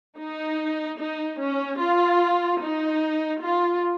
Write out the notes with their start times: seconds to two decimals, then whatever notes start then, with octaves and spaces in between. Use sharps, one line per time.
0.17 D#4
0.98 D#4
1.38 C#4
1.79 F4
2.60 D#4
3.41 F4